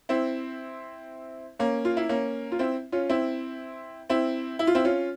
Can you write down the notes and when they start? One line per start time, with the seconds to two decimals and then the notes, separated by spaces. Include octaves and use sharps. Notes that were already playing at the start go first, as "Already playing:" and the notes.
0.09 C4 E4
1.59 A#3 C#4
1.85 F4
1.97 E4
2.09 A#3 C#4
2.52 F4
2.59 C4 E4
2.92 C#4 F4
3.09 C4 E4
4.10 C4 E4
4.59 E4
4.67 F4
4.75 C4 E4
4.85 C#4 F4